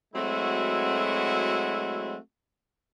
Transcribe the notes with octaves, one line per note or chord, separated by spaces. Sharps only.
F#3 G#3 A3 C4 E4 F#4